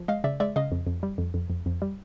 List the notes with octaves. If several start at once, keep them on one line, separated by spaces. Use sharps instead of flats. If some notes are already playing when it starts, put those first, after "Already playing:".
Already playing: F3
G#3 D#5 F5
C#3 D5 E5
G#3 D5 E5
C#3 D#5 F5
F2
F2
G3
F2
F2
F2
F2
G3